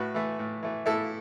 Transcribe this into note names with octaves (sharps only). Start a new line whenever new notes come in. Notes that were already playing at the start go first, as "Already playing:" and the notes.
Already playing: A2 F#4 B4
E3 A3
A2
E3 A3
A2 E4 A4